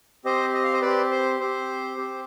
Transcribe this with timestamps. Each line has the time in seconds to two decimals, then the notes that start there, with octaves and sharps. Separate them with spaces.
0.25 C4 G4 C5 D#5
0.54 D#5
0.64 F5
0.73 C5 D#5
0.82 C4 G4 B4 D5
1.12 C5
1.40 C4 G4 C5
1.97 C4 G4